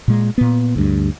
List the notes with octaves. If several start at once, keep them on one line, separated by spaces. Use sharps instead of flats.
A#2 G#3
A#2 B3
D2 G2